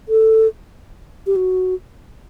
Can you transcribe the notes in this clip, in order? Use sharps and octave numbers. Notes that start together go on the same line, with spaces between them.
A4
G4
F#4